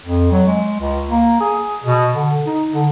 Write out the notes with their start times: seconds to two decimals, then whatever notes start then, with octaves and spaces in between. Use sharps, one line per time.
0.06 F2
0.31 F#3
0.47 G#3
0.80 C#2
1.09 A#3
1.40 G#4
1.84 B2
2.14 D3
2.46 D#4
2.73 D3